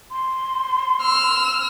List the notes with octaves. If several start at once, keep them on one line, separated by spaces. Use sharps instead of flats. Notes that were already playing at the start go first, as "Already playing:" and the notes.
C6
E6 F6